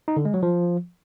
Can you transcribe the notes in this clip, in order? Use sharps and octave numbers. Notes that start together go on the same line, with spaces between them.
D#4
D3
G#3
F#3
F3